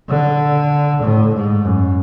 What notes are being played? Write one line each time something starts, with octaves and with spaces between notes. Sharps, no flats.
D3
A2
G#2
F#2